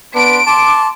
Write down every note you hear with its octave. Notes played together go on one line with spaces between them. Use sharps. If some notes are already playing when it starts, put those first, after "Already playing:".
B3 D4 C6 D7
A5 C6 D6